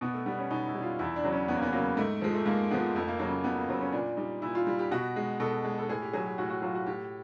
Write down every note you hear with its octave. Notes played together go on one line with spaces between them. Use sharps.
B2 B3
A3
G3 B3
C#4
B2 D#4
E4
G3
F4
E2 E4
D4
C#3 F#3
C#4
E2 B3
A#3
B3
C#3 F#3 A#3
G#2 A3
F3 G#3 A3
A3
G#2 A#3
F3 G#3 B3
F2 A3
A#3
F#3 A#3
C#3
A#3
F2 B3
A#3
C#3 F#3 C4
C#4
A#2 D4
G3 D#4
A#2 E4
F4
G3
G4
B2 F#4
G#3
B2 A4
G#3
A4
A2 G#4
G4
F#3 G#4
G4
A2 F#4
F#4
F#3 F4
F#4
A2 G4